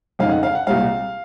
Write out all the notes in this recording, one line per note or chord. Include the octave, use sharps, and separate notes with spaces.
F2 C#3 G#3 D#4 F5
F#5
F5
F#5
C2 A#2 G#3 F5